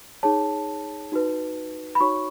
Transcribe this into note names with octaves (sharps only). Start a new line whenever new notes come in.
D#4 G#4 C#5 A5
D#4 F#4 B4
B5
D#4 F#4 C#5 C#6